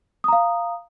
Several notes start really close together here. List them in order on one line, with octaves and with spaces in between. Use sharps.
D#6 A#5 F5